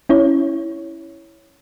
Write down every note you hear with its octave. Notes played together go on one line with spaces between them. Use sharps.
C#4 E4 C#5